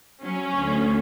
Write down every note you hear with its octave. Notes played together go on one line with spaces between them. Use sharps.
F#3 C#4
D2